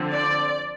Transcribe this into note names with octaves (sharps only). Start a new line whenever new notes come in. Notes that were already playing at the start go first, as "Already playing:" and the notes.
Already playing: D3 F3 C4
D5